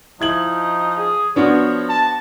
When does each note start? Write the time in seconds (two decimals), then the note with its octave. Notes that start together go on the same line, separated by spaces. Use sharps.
0.21 F3 D#4 E4 G#6 F#7
0.98 G#4
1.36 F3 B3 D4 F#4 C#5
1.89 A5